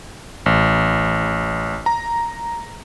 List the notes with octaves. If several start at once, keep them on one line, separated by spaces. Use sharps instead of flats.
A1
A#5